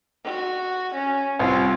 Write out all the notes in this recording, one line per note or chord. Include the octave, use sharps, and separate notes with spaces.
F#4
C#4
C2 C4 F4